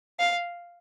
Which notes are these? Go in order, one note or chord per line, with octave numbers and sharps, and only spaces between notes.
F5